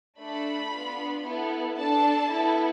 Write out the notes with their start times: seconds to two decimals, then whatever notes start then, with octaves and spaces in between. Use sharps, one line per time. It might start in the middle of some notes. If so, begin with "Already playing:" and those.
0.20 A3 D4 A4 B5
0.73 B3 D4 F4
1.26 B3 E4 A4
1.78 D4 A4 A5
2.30 B3 E4 A4